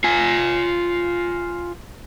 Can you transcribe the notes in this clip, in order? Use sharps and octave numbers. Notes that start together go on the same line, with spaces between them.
F4 G#5